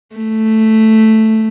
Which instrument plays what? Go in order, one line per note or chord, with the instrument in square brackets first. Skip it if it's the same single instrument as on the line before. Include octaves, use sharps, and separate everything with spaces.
[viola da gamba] A3